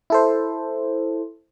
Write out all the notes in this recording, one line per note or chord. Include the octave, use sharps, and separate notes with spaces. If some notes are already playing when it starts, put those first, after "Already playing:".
E4 A4 C5